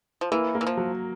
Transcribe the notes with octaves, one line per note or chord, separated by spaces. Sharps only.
F3
E3 A#3
A#3
E3
F3
F#3